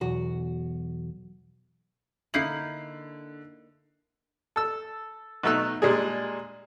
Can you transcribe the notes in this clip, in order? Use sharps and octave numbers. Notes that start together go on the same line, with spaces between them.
B1 E2 F#4
D3 A#3 D#4 E4 C7 F#7
A4 E6
B2 F#3 A3 D#4 E6 F#6
A#2 G3 G#3 D4 G#4